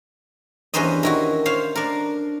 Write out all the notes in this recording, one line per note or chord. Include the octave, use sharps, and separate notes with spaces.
E2 G2 C#4 B4 C5 D#5
D#3 E4 F#4
C5 C#5 F5
D4 A#4